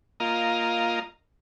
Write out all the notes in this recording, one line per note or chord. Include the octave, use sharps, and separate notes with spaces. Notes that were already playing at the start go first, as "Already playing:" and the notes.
A#3 F4 D#5 A#5